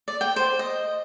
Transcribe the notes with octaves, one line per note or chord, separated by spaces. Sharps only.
D5
G5
C5
D#5